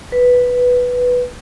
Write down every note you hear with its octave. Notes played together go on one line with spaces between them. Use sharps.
B4